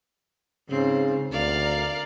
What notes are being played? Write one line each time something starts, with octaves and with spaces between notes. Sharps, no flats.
G#2 C#3 C4
D2 A#4 D5 F5